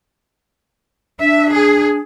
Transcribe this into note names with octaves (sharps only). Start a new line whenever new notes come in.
D4 E5
G#4